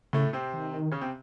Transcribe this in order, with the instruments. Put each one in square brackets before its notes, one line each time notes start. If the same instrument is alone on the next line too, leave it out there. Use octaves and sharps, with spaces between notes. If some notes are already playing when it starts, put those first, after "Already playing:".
[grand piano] A2 A3 [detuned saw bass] C#3
[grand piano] C3 C4
[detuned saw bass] D#3
[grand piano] C#3 C#4
C3 C4